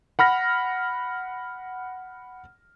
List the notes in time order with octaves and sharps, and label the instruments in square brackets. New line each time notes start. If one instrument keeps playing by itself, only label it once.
[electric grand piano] F#5 B5 F6 A#6